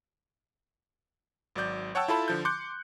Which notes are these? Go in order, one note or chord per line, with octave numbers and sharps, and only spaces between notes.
G#1 F#3 D5 G6
C#5 F#5 G5 A5 E6
E4 F4 A4 A5 B5
D3 F3 G6
C6 D6 F#6 G6 C#7